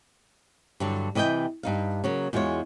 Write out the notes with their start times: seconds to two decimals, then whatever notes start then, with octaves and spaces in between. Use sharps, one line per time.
0.80 G2 D3 F#3
1.15 C3 E3 D#5 E5 G5
1.63 G2 D#4 F5
2.04 C#3 F#3 A#3
2.33 E2 G#3 F4 F#4 C#5